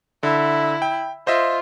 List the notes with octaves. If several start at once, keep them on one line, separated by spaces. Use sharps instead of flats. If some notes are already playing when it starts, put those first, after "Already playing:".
D3 E4
G5
F4 C5 D#5 E5